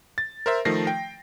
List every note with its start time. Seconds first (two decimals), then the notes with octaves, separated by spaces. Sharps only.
0.18 A6
0.46 A#4 C5 E5
0.65 D#3 F3 A3 A#6 C7
0.87 G5